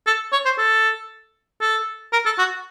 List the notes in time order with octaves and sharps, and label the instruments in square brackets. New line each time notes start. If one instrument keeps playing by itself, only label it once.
[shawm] A4
C#5
C5
A4
A4
A#4
A4
F#4